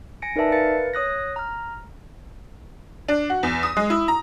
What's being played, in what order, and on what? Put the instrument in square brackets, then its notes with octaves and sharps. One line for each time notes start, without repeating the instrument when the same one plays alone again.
[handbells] G#5 A#6 C#7 D7
D#4 A#4 B4 D5 E5 A5
A#4 B4 F5 A6 C#7
C#5 D#6 F#6 A#6
A#5 F6
[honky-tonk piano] D4
F#4
E2
D#6
G#3
E4
A#5